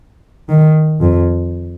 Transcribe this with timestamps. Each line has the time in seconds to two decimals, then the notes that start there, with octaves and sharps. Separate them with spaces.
0.49 D#3
1.01 F2